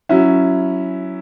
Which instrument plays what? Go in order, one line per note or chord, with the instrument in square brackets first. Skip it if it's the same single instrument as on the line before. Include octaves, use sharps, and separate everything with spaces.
[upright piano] F#3 C#4 E4